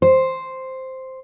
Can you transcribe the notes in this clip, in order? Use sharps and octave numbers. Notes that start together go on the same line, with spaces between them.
C5